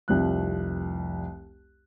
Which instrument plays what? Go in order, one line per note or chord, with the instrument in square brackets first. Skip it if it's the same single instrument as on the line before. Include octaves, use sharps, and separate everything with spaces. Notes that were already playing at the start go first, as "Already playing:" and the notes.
[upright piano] F1 C2 F3 F#6